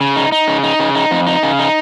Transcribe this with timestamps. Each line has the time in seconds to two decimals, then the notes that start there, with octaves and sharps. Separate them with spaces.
0.01 C#3
0.16 D#4
0.32 D#4
0.48 C#3
0.63 D#4
0.79 C#3
0.95 D#4
1.11 F2
1.27 D#4
1.43 C#3
1.59 D#4